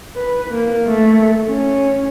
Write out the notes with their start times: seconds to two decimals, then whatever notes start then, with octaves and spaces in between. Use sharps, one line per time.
0.16 B4
0.51 A#3
0.87 A3
1.49 C#4